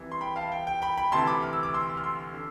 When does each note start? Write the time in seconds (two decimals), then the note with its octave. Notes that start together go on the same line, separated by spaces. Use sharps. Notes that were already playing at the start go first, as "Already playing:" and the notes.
Already playing: C2 C3 E3
0.12 C6
0.21 G5 B5
0.36 F5 A5
0.52 G5
0.67 G5
0.82 G5 B5
0.97 G5 B5
1.12 D2 C3 E3 A5 C6
1.27 B5 D6
1.43 F6
1.53 E6
1.63 D6
1.74 C6 E6
1.97 F6
2.04 C6 E6
2.33 D3